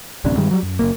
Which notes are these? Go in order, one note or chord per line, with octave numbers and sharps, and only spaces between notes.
D1 A1 C3 D4
G2 D#3 G3 G#3
F#3 G3
F#2
F#1 F2 A#3